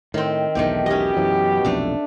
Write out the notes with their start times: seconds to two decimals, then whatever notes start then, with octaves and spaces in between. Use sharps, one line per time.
0.14 A2 D#3 C4
0.55 B1 E2 G#2 D#3 A3 G4
0.86 B2 C#4 G4 D#5
1.17 F#2 E3 F#3
1.65 F1 B1 F2 A3 D4